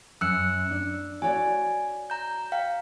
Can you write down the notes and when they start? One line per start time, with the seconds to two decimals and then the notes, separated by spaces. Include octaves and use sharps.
0.21 F#2 E6 F#6 C#7
0.71 D4
1.22 F#4 C#5 D5 G#5
2.10 A#5 G6
2.52 F5 G5